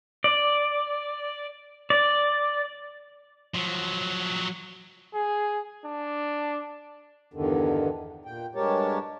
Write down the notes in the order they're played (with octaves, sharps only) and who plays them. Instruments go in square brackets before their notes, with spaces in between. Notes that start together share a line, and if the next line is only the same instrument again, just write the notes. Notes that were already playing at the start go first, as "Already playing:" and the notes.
[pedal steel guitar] D5
D5
[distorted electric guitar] F3 F#3
[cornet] G#4
D4
[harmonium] E2 G2 D3 D#3
A#2 G5
G2 G#3 G4 A#4 C#5 A5